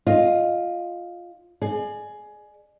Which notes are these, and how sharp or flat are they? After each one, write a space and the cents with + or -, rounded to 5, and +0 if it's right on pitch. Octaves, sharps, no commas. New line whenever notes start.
F4 +0 D#5 +0
G#4 +15 D5 +45